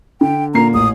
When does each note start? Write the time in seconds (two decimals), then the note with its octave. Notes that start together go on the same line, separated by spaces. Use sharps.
0.21 D3 G5
0.54 A#2 A#3 A#5 C7
0.74 A1 D#6